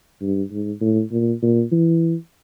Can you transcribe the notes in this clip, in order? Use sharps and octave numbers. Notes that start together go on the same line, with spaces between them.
G2
G#2
A2
A#2
A#2
E3